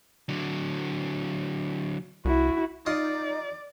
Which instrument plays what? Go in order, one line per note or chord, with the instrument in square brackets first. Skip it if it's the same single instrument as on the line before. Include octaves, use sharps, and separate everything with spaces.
[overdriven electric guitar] D3 F#3
[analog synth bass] C2 [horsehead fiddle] E4 F#4
[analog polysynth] D#4 [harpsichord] F4 D#5 [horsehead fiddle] D5